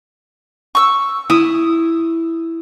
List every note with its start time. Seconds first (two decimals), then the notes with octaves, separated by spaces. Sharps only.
0.75 C#6 E6
1.30 E4 D#6